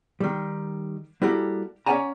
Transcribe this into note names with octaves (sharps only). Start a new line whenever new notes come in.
D#3 G3
G3 A#3 E4 F#4 G4 A4
C#4 C#5 D5 F#5 G#5 A#5